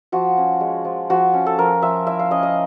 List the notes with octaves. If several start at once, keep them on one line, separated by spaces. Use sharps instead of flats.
F3 F#4
C#4
G#3
F3
F3 F#4
C#4
A4
F3 A#4
F3 E5
E4 E5
F5
C#4 D#5
D#5